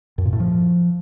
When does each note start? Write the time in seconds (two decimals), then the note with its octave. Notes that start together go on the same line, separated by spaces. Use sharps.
0.18 F#2
0.25 A#2
0.33 A2
0.40 F3